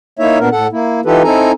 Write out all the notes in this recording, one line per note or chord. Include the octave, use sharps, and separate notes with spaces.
A#3 D#4 E4 C#5 E5
A#2 B3 D4 A#4
A2 A4 F#5
A#3 E4
E3 D#4 F4 G4 A4 B4
C4 D#4 E4 A4 G#5 A#5